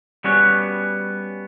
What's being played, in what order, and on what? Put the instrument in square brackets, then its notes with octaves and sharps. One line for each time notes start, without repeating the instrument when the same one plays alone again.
[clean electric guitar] G3 B3 C#4 F#4 C#5